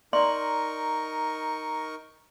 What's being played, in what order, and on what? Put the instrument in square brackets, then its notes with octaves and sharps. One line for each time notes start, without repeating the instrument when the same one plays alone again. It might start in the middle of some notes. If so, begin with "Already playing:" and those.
[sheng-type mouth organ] D#4 A#4 C#6 [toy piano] D5 C6